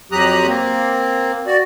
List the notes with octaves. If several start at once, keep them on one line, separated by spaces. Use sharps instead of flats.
F2 F#3 G4 A#5 D#6 F#6
A#3 C4
F#4 D5